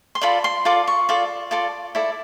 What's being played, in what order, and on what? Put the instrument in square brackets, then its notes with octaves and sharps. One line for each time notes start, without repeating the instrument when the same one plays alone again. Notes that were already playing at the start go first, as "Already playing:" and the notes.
[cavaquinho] C6
F4 A4 D5 B5
C6
F4 A4 D5 D6
C#6
F4 A4 D5
F4 A4 D5 D6
E4 A4 D5